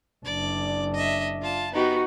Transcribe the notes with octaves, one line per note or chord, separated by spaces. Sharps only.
F#1 D4 D5
D#5 E5
F4 A5
B3 D#4 F#4 G4